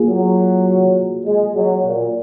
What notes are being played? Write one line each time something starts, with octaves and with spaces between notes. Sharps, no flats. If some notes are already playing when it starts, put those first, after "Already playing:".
Already playing: A#3 F4 G#4
F#3
G#3
F#3
A#2